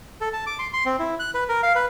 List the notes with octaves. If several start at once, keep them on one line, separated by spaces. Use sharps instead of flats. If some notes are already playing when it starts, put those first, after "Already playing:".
A4
A5
D6
C6
C6
C4
E4
F#6
B4
A#4
F5
B4